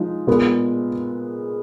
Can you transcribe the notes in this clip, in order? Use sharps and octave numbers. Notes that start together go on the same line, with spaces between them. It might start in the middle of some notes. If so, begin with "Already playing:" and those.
Already playing: F3 G#3 D#4
A#2 G#3 B3